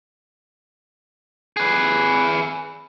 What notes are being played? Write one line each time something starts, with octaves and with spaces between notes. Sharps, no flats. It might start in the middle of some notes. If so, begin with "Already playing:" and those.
G#4 B4